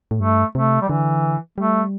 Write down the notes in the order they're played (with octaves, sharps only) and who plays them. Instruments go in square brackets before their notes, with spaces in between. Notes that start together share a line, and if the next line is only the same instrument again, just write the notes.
[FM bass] A2
[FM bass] G2 [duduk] A3
[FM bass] C3 [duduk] A3
[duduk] G3
[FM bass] D3 [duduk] E3
[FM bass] G3 [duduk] A3